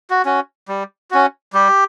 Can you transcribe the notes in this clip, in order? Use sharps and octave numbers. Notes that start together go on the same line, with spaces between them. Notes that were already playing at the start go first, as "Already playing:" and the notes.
F#4
C#4 F#4
G3
C#4 F#4
G3 G4